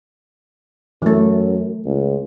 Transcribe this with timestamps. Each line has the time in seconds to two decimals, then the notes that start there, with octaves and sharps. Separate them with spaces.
1.02 F#2 E3 A3
1.86 C#2